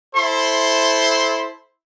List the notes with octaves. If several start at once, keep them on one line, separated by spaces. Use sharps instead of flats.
E4 A4 C5 C6